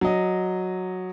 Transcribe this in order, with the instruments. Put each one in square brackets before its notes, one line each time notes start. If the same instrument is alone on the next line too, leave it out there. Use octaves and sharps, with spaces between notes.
[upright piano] F#3 D#5